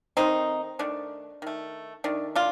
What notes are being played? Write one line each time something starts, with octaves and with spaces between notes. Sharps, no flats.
D#3 A3 C4 D#4
D#3 A3 D4
D#3 A3
D#3 A3 D4
D4 F4